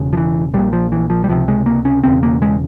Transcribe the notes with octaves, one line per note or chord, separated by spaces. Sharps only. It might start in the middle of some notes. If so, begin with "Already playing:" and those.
Already playing: E1 E2 C#3
F3
E3
A#1 A#2 G3
F3
E3
F3
G3
C#2 C3 F3
G#3
A#3
C#4
E1 E2 C#3 C4
A#3
G#3